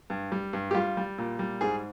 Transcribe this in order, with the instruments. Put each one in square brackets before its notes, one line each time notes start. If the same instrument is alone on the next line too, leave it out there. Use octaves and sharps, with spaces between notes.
[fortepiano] G2
G3
G2
G4
G3 F4
G3
A#2
G3
G#2 G#4